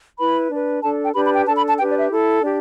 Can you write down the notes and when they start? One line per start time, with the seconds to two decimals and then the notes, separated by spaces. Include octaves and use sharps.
0.18 E4 B4 B5
0.50 D4 B4
0.82 D4 A4 A5
1.04 G5
1.14 D4 G4 B4 B5
1.25 B5
1.36 G5
1.46 D4 A5
1.49 A4
1.57 B5
1.68 A5
1.78 D4 G4 B4 G5
1.89 D5
2.00 E5
2.10 E4 A4
2.42 D4 G4